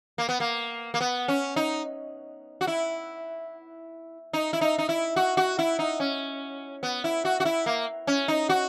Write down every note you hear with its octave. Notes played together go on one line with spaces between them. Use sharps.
A#3
B3
A#3
A#3
B3
C#4
D#4
F#4
E4
D#4
E4
D#4
D#4
E4
F#4
F#4
E4
D#4
C#4
B3
E4
F#4
F#4
E4
A#3
C#4
D#4
F#4